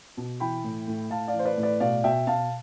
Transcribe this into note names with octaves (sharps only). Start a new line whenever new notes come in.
B2
E3 G5 B5
A2
A2
A2 F5 A5
D5 F5
E3
C5
B4 D5
A2
B4 D5
B2 D5 F5
B2 E5 G5
B2 F5 A5